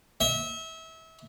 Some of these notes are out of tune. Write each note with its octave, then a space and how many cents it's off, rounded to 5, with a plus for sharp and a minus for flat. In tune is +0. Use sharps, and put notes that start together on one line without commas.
E5 -30